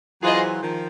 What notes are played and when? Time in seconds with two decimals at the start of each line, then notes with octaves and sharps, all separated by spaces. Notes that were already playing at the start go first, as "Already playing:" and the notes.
0.22 E3 F#3 F4 G#4 C5 D#5
0.62 D#3 F3